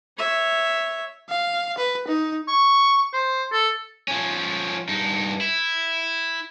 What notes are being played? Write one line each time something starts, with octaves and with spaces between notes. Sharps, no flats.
C#5 E5
F5
B4
D#4
C#6
C5
A4
F3 C#4
G2 D#4
E4